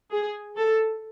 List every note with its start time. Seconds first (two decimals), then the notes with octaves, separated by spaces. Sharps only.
0.11 G#4
0.57 A4